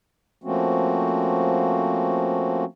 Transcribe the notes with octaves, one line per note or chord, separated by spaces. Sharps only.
F3 A3 A#3 C4 C#4 F#4